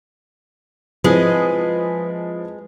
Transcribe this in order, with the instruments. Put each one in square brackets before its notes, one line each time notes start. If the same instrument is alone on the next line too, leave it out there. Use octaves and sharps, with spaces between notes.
[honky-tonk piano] F3 [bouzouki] G#3 [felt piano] C4 E4 G#4 [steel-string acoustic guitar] B4